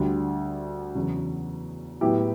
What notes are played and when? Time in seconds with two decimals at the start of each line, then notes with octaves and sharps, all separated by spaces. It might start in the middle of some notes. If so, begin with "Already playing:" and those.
Already playing: D2 D3 G3
0.95 E2 C#3 F#3
2.01 A2 F#3 B3 E4 G4